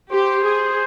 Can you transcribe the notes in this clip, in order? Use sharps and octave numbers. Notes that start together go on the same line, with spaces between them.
G4 C5
G#4